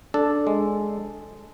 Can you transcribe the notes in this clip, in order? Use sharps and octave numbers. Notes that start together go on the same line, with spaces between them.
D4 A4
G#3